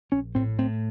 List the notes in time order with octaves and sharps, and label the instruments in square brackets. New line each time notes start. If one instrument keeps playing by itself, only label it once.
[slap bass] A#1 C#4
A2 C4
A2 C4